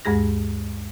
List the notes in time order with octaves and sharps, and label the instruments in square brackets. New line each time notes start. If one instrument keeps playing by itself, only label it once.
[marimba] D2 G2 G#3 G#4 A#6